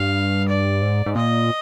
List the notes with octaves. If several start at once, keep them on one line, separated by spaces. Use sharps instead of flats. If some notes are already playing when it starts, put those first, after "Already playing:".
Already playing: G2 F5
D5
G#2
G#2
A#2 D#5